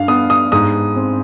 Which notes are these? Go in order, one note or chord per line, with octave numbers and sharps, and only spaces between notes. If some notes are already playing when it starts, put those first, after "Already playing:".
Already playing: G2 F5
B3 D#6
D#6
G#2 D#6
C4